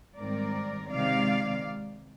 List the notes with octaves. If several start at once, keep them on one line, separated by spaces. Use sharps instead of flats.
G#2 D#3 G3 C4 A#4 D5
C3 D#3 G#3 D5 F5